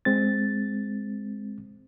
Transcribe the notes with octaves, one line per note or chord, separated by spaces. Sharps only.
G#3 C4 A6